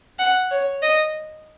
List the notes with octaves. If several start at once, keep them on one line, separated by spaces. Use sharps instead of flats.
F#5
C#5
D#5